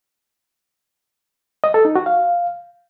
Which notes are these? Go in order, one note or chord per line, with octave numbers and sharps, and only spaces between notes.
D#5
A4
D#4
F#4
F5